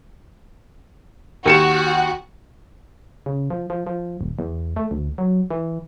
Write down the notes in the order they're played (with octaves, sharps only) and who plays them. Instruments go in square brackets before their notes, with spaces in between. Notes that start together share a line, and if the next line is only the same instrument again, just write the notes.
[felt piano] D#2 C#7 E7 [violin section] F#4 F#5
[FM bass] C#3
F3
F3
F3
D#1
E2
A3
D2
F#3
E3